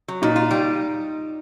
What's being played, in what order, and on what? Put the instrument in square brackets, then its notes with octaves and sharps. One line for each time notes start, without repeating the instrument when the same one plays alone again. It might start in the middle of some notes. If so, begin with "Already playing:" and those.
[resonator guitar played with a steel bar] F#3
[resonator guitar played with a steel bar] A#2 [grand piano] D#4
[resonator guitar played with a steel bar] F4
G3